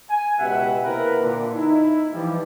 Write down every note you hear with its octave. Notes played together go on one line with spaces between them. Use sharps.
G#5
C#2 B2 G4 E5 F#5
C3 A#3 E4 A#4 B4
A#2 D3
D#4 E4
E3 F3 G3